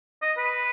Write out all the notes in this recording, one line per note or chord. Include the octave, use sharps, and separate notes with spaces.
D#5
B4